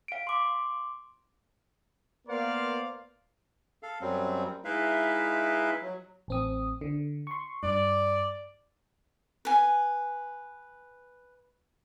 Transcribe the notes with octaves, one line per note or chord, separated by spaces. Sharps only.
F5 D7
C6 D6
A#3 B3 A#4 C5 D5 F5
A4 F5
F#2 F#3 G3 C4
G#3 D#4 E4 B4 E5 F5
F#3
A1 C4 D#6
D3
C6 C#6
G2 D5
B4 G#5